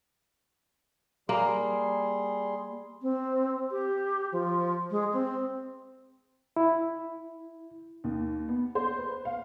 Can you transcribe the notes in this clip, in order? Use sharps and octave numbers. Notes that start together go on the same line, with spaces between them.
G3 A#3 G#4 C6
C4
G4
F3
G#3
C4
E4
D#2
B3
C5
B4
F5